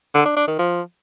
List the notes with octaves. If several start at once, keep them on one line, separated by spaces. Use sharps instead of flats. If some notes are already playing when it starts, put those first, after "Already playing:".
D3
D4
D4
D#3
F3